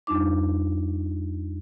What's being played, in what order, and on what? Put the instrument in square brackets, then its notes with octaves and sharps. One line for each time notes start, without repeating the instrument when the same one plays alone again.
[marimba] F2 G3 D4 D#4 D6